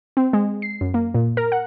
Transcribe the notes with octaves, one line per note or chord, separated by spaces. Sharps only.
C4
G#3
C7
F#2
A#3
A#2
A#4
F#5